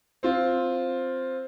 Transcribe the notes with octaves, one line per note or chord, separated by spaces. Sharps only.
C4 F4